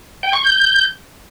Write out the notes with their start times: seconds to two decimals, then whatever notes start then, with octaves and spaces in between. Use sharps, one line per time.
0.23 G5
0.33 C#6
0.43 G6